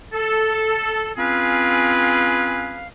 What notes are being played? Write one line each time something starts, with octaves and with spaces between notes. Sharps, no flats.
A4
C4 C#4 F4 G#4 B4 F5